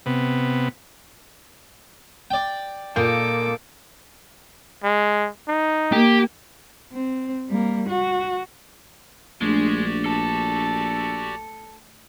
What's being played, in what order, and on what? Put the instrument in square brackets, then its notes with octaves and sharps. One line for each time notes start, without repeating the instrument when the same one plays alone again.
[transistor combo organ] C3 B3
[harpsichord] D5 G5
[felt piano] A#2 G6 [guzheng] A#3 D#4 [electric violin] A4 D6
[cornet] G#3
D#4
[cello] A#3 [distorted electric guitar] G4
[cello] C4
G3 A#3
F#4
[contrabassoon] A#1 [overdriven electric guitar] G#3 [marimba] A3 D4 [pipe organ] F#4 G4 D5
[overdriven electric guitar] A4 A5